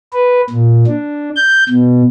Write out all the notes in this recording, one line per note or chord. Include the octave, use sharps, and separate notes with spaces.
B4
A#2
D4
G6
B2